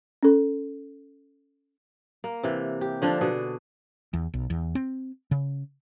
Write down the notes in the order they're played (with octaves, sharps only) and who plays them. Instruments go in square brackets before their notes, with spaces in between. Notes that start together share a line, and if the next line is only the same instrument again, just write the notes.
[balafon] C#4 A4
[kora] A#3
C3 E3
G4
D3 F3 D4
B2 D4 G#4
[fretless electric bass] E2
B1
E2
C4
C#3